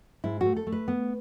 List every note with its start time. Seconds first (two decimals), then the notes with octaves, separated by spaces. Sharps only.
0.24 G#2 E4
0.41 F#4
0.46 A3
0.56 A4
0.67 A3
0.72 B4
0.88 B3